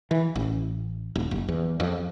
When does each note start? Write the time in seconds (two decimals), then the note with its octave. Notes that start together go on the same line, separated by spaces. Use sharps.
0.11 E3
0.36 A1
1.16 D#1
1.31 F#1
1.48 E2
1.80 F2